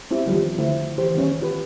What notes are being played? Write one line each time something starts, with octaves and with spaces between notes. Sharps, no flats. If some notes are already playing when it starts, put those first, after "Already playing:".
C4 E4 G4
D#3 F3 G3 B3
D3 A3 E4 C5
E3 G4 C5
D#3 G3 B3 C#4
D#3 F4 G4 B4